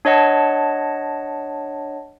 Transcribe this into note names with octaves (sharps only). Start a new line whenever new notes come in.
D4 C#5 D#5 F#5 A5